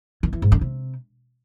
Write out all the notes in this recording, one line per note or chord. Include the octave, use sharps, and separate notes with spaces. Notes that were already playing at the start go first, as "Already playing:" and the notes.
D#3
E3
G#2
D3
C3